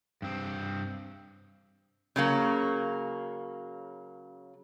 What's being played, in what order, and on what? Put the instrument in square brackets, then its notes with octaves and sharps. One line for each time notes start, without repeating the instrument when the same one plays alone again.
[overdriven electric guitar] G2 C4
[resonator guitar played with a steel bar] C#3 F#3 A#3